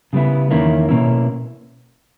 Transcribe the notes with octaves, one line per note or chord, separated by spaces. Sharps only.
C#3 G3 B3 E4
E2 D#3 A#3 C#4 E4
B2 A#3 C#4 E4